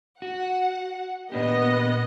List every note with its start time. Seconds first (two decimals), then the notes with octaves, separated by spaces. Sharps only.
0.22 F#4 F#5
1.32 A#2 B3 D4 G4 D#5